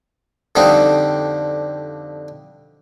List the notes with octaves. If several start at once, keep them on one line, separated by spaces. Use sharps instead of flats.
F2 D3 G3 C4 D4 D#4